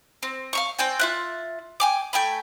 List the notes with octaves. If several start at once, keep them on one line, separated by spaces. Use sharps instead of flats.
C4
F5 A#5 C#6
C4 D5 G5 G#5
F4 E5 F#6
G5 G#5 D6
A3 G5 G#5 B5